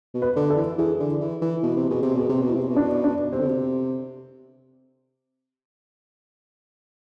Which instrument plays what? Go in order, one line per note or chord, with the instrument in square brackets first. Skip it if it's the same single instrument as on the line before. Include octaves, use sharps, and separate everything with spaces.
[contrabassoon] B2
[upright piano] B4
[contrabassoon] D3
[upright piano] A4
[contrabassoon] E3
[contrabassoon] E3 [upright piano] G#4
[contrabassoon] D3
E3
E3
B2
C3
[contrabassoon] B2 [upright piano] G#4
[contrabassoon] C3
[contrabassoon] B2 [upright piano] G#4
[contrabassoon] C3
B2
[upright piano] E4
[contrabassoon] C3
B2
[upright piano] D4
D4
[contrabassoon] C3 [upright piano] C4
[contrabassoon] D3
C3